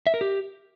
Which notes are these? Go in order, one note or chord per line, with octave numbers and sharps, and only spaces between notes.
E5
A#4
G4